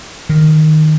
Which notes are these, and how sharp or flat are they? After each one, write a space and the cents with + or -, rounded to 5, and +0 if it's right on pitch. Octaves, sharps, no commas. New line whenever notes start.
D#3 -5